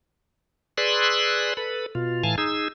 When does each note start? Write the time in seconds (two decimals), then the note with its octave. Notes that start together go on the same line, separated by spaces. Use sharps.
0.78 G#4 B4 D5 C6 E6 F#6
1.57 A4 B4 B5
1.95 B2 F4
2.24 A2 E3 F5 G#5 A5
2.38 D#4 G#4 E6